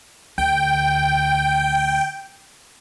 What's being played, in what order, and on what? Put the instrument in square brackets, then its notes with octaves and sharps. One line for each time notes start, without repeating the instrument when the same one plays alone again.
[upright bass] D2 [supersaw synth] G5